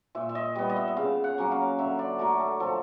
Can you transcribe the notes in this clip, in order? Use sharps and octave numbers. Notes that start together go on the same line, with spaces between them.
A#2 E5
E5
D#5
G3 B3 D#5
D#5
E5
E5
C#3 F5
F#5
F#3 A#3 C#4
F5
D3 E5
D5
F#3 A3 A#4
A4
F3 A4